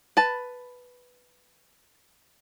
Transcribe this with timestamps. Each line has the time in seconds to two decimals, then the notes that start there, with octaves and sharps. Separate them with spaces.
0.17 B4 A5